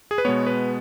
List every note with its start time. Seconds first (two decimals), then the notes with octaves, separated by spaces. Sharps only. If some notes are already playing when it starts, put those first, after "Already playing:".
0.11 G#4
0.18 B4
0.25 B2 G#3 B3 C#5
0.47 B4